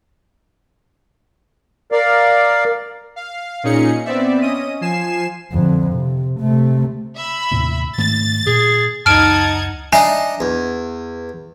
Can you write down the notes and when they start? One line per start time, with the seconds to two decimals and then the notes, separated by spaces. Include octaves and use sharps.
1.92 A#4 D5 F5
3.16 F5
3.63 A#2 C#4 D#4 G#4 C#7
4.05 B3 C4 D5 E5
4.42 C#4 D#5 D#6 D#7
4.81 F3 G#5 C7 E7
5.52 F2 D3
5.93 C3
6.40 C3 A3
7.18 E5 B5
7.51 D#2 A2 C3
7.98 G#2 D#3 A3 A6
8.47 A#2 G#4
9.06 C#2 F#2 D#4 F#5 A5 F6 G#6 D7
9.93 D4 D#4 E5 G#5 A#5
10.40 E2